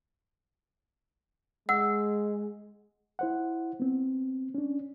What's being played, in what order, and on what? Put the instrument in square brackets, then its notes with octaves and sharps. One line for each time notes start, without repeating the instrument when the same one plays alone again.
[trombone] G#3 [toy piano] F#5 [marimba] E6
[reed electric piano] E4 C5 F#5
B3 C4
C#4 D4